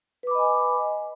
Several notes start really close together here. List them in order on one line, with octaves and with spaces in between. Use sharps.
B4 D6 B5 D#5 G#5